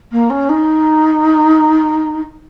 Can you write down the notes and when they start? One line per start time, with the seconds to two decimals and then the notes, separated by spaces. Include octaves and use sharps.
0.11 A#3
0.29 C#4
0.48 D#4